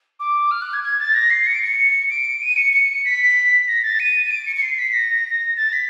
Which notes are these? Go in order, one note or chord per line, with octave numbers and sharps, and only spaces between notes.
D6
F6
F#6
G#6
G#6
A6
A#6
C7
C#7
D7
C#7
D7
D#7
C#7
C#7
B6
A#6
A6
D#7
D#7
D7
C#7
C#7
C7
B6
A#6
A6
B6